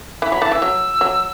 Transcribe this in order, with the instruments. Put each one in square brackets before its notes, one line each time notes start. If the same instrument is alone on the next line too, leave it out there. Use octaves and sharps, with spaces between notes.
[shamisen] E3 [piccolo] B5
[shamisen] F#3 [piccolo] B5
[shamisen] E3 [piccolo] A5
[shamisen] E3 [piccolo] E6
[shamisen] F#3
F#3